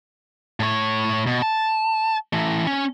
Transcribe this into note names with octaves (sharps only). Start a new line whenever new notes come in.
A2 C#5
B2
A5
E3 A3
C#4